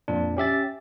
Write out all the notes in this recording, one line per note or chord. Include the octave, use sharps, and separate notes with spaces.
F2 A#2 D4
C#4 G4 E5 A6